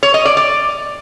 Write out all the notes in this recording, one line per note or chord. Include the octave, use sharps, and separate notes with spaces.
C#5
D#5
D5
D5